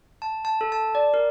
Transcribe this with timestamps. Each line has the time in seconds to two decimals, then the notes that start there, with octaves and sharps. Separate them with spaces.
0.22 A5
0.45 A5
0.61 A4
0.72 A5
0.95 D5
1.14 A#4